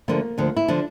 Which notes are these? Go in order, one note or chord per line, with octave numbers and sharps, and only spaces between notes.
D2 D3 F3 A#3
D2 D3 F3
E4
D3 F3 D4